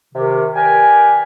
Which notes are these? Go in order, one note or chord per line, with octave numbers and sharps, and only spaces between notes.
C3 D#3
G4 A#4 B4 D5 G5 G#5